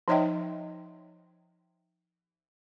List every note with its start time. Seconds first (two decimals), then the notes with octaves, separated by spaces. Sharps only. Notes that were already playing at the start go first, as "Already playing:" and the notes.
0.08 F3 D#4 C#5 D#5 E5 G5